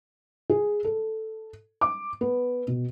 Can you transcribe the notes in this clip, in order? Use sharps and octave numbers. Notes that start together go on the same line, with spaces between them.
G#4
A4
D6
B3
B2